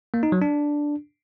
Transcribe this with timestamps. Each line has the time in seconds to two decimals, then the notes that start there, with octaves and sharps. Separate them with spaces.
0.14 A#3
0.23 D#4
0.32 F#3
0.42 D4